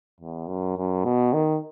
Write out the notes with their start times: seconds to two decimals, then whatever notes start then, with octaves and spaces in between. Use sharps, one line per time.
0.20 E2
0.48 F#2
0.77 F#2
1.05 B2
1.33 D#3